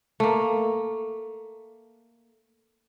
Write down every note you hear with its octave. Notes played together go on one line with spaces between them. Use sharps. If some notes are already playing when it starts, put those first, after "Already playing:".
A3 A#3